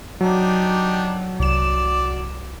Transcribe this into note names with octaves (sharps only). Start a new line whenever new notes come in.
F#3 D4 D#4 G4
C2 D5 E7